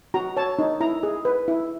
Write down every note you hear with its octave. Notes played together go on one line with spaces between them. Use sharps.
F#4 A#5
C#5 A5
D#4
E4 A#5
G#4
B4
E4